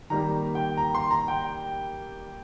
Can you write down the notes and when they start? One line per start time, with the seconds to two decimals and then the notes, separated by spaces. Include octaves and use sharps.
0.10 D#3 G3 A#3 A#5
0.55 G5
0.77 A#5
0.95 C6
1.11 A#5
1.28 G5